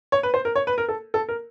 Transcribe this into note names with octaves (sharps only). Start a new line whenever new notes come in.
C#5
B4
C5
A#4
C#5
B4
A#4
A4
A4
A#4